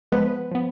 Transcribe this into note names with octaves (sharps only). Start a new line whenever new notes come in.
F3 G#3 B3 B4
F3 B3